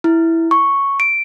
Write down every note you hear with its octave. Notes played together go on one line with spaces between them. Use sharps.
E4
C#6
D7